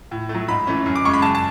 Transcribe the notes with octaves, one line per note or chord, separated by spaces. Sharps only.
A2
A3
F#3
G#2 B5
E3 A3 C#4
F#2
D6
C#3 G#3 C#6
B5
F#2 A5
A5